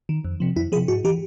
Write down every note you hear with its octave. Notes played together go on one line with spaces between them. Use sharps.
D#3
F2
C3 F3
F2 E4
C3 F3 G#4
G#2 F#4
E3 G4